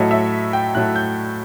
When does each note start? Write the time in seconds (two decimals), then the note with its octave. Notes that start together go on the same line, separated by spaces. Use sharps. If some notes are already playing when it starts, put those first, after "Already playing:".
Already playing: A2 F#3 A3 D#5
0.11 E5
0.53 G5
0.75 A2 F#3 A3 F#6
0.96 G6